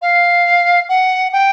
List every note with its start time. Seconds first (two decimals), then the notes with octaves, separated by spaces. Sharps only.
0.02 F5
0.89 F#5
1.33 G5